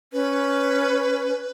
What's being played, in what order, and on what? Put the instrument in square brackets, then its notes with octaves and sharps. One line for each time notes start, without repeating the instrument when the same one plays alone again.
[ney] C#4 [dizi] B4